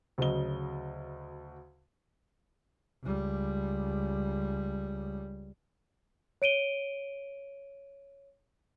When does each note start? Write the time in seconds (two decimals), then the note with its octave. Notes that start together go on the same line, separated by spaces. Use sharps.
0.18 D2 C#3 F#3 D#5 G7
3.03 C#2 G3
6.42 C#5 D7 D#7 G7